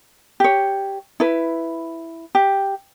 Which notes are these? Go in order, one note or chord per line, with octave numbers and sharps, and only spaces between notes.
G4 C#5
E4 B4
G4